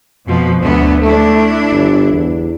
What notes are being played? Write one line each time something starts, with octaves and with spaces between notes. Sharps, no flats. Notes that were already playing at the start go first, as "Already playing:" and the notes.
F2 B2 F3
D2 A3 B3
A3 D4 E4
G1
E2